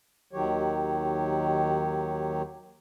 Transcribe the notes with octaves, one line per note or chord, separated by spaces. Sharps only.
D#2 D#3 F#3 G4 C#5